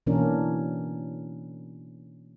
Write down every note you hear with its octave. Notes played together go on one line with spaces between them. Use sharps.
B2 E3 A#3 C#4 D4 A#4